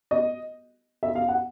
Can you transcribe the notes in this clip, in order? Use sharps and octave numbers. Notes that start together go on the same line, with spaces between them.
D#5
E5
F5
F#5